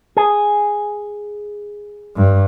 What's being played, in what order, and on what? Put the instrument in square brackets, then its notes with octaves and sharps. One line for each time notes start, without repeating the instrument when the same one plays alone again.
[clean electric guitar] G#4
[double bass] G2